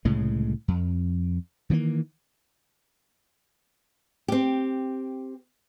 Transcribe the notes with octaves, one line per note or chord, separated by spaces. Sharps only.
C2 A2 C#3 G#3
F2
D#3 E3 A3 A#3
C4 G4